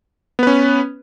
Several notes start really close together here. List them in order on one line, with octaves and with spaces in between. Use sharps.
B3 B4 C#4